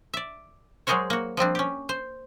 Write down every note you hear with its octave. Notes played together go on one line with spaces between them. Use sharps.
D5 E5
F#3 G#3 G#4 A#4 C5 C#5
A#3 F#4
F3 G3 C4 D4
C#4 G4
C5